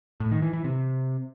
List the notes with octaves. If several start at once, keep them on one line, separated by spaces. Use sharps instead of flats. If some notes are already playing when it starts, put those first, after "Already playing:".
A2
D#3
E3
E3
C3